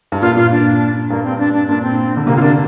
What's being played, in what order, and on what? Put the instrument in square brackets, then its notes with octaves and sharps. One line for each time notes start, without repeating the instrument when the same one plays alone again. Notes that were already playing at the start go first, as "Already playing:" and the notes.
[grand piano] G2
[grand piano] A#2 [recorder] F4
[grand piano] A#2 [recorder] F4
[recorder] D4
[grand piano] G2 [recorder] A#3
[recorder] C4
D4
D4
[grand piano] A#2 [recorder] D4
[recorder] C4
[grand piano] D3
[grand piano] C3 [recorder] A#3
[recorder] F4
[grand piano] A#3 [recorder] D4